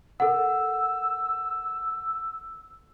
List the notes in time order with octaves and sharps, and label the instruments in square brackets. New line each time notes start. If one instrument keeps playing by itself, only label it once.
[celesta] A4 A#4 F#5 [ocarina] E6